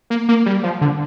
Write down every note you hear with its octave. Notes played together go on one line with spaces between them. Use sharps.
A#3
A#3
G3
F3
D3